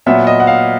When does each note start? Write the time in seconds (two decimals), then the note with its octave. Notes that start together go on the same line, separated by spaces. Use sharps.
0.06 A#2 F#3 B3 E5
0.27 D#5
0.40 F#5
0.47 F5